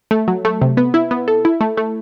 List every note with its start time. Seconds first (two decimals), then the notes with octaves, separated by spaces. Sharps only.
0.11 A3
0.28 F#3
0.45 A3
0.62 C3
0.77 B3
0.94 E4
1.11 B3
1.28 A4
1.45 E4
1.61 A3
1.77 A3